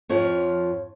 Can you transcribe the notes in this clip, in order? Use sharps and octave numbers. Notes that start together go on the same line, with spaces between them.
F2 F3 C#5